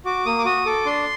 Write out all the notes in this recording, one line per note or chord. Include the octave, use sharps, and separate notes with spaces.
F#4 D6
A#3 D#6
D6
F#4 D#6
A4 D6
D4 C6